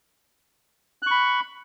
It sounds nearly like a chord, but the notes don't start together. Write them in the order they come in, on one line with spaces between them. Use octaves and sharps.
F#6 C#6 B5